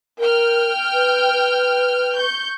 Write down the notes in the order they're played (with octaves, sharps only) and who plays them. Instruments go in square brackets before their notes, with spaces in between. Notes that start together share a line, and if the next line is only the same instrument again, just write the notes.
[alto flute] A#4 [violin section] G5 F6
[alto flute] B4
B4
[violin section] C#6 G6